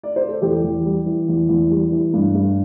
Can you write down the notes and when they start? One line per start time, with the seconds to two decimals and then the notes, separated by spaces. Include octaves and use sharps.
0.03 D5
0.16 C5
0.29 A4
0.42 E2 G4
0.64 E2
0.85 G3
1.06 E3
1.28 E2
1.49 E2
1.71 G3
1.92 E3
2.13 G2
2.35 G2